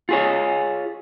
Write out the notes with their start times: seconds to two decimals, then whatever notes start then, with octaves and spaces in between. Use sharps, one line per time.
0.09 F4 G#4 C#5